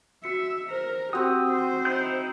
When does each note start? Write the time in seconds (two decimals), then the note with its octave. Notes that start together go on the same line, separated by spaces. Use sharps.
0.24 F#4 E5 C#7
0.71 A#4 C5
1.13 C4 F#4 G4 G5 D#6
1.49 C5
1.85 D#4 E4 G6